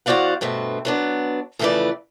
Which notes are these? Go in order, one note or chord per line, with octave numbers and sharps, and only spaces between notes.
E2 F#4 C5 D5 F5 F#5
G2 B2 A3 C4
F#3 B3 D4
F2 C#3 E3 A3 B4 D5